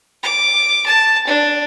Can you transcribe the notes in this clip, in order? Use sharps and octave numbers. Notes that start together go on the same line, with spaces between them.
D6
A5
D4